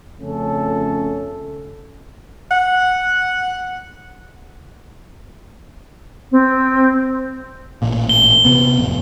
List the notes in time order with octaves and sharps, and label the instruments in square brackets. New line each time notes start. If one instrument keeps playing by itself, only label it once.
[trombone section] F2 C#3 A3 C#4 A4
[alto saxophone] F#5
[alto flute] C4
[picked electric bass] A1 A#2
[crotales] G7
[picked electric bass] C3 B3
A1 F2